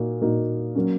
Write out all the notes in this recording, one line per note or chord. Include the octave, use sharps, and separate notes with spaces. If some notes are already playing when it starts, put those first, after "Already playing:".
Already playing: A#2 A#3 D#4 F#4
A#2 A#3 D#4 F#4
F#3 A#3 C#4